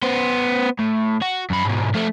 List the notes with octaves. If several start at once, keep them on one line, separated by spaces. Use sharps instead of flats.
B3 C5
A2
F#4
F#2 B5
G#2 B2
F3 A3